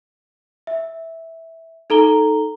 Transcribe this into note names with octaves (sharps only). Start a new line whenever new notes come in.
E5
D#4 A4 A#5 G7